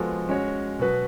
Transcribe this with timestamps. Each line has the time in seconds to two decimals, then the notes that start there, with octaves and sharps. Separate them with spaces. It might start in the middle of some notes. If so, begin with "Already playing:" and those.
Already playing: F3 G#3 B3 F#4 A4
0.29 G#3 C#4 F#4 C#5
0.79 B2 F#3 B3 F#4 B4